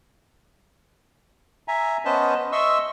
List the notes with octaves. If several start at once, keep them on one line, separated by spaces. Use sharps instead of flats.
E5 G#5 A#5
B3 C#4 B4 C5 D#5 A5
D#5 E5 C6 C#6 E6